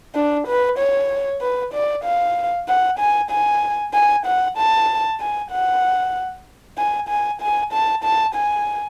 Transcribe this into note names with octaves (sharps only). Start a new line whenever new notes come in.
D4
B4
C#5
B4
D5
F5
F#5
G#5
G#5
G#5
F#5
A5
G#5
F#5
G#5
G#5
G#5
A5
A5
G#5